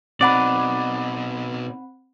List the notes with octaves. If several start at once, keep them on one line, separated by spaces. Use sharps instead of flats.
B2 C4 D#4 D5 F#5 B5